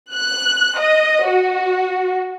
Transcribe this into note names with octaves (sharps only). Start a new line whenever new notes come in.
F#6
D#5
F#4